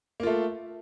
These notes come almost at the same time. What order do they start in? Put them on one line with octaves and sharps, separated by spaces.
A#3 F4 A3